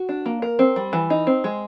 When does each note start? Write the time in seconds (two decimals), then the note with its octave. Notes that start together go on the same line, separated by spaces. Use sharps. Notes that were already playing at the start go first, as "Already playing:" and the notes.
Already playing: F#4
0.09 D4
0.26 A#3
0.42 A#4
0.59 C4
0.76 G3
0.93 E3
1.10 D#4
1.27 C4
1.44 G#3